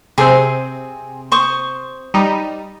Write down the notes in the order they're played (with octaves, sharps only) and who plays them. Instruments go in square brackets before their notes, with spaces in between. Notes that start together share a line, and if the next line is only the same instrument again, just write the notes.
[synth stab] C3 C4 [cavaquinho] G#4
[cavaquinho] C5 C#6 D#6
[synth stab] G3 D#4